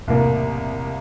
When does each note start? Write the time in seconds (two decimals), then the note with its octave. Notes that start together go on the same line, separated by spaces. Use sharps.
0.08 E1 C2 A2 A#3